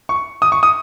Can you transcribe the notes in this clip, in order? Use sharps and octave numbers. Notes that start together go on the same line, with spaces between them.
C#6
D#6
C#6
D#6